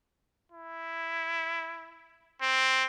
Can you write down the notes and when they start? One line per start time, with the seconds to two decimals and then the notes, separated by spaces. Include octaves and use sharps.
0.52 E4
2.42 C4